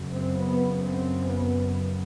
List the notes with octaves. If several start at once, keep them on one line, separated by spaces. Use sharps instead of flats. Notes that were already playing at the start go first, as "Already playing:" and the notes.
Already playing: F#2 C#3
C4
B3
C4
B3